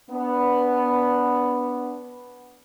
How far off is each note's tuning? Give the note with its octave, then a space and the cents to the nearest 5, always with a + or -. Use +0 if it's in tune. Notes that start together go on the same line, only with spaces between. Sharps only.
B3 +0 D4 -20